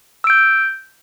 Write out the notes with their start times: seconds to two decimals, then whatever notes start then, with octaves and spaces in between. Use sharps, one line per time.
0.24 E6
0.27 D7
0.30 G6